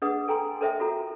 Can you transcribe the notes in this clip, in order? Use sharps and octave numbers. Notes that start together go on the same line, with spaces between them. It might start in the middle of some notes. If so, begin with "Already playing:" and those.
D4 G#4 B4 D#5 F#5 D#6
A4 G5 G#5 A#5 C6
A4 A#4 C5 D#5 E5 G5
F4 F#4 A4 A#5